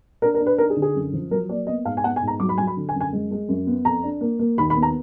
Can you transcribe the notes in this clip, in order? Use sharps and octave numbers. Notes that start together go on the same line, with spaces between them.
D4 A#4
A#4
D4
B4
D#4 A#4
G#4
D3
G#4
F#2
F3
F#3 A#4
A#3 D5
B3 D#5
G#2 F5
G#5
B3 F#5
G#5
G#2
A#5
F#3 D6
B5
F#3 G#5
B5
D3
G#5
F#2
G#5
G#3
G#3
F#2
B3
F2 A#5
D4
A#3
A#3
D#2 B5
B5
B3
A#5